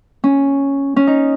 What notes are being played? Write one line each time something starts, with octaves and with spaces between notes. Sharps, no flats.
C#4
C#4
D#4